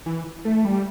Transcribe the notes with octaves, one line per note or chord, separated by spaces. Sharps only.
E3
A3
G3